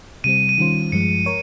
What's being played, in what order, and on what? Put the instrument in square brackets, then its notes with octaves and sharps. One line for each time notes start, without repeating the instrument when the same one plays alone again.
[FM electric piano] C3 G3 C4 [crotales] D#7
[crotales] D#7
[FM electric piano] D#3 G3 C#4 F4 C5
[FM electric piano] G2 F3 G#3 [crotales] C#7
[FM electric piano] A#4 C#5